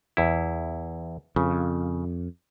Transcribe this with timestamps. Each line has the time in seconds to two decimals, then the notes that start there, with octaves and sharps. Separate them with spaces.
0.17 E2 E4
1.36 F2 C#3